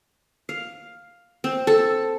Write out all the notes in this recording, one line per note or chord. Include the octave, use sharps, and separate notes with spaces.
F5
C4
A4